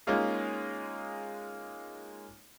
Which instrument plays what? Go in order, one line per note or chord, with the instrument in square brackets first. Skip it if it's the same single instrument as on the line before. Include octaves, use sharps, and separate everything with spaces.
[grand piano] G#3 A#3 C#4 D#4 F4 G#4